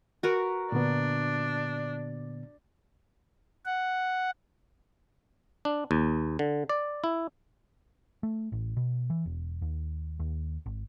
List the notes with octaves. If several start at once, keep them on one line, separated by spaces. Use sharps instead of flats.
F#4 A#4 B4
A#2 D3 B3 D4
F#5
D4
D#2
D3
D5
E4
A3
A1
B2
E3
E1
D#2
D#2
G#1